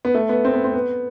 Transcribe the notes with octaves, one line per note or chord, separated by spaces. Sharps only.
B3
A3
B3
C4
B3
C4
B3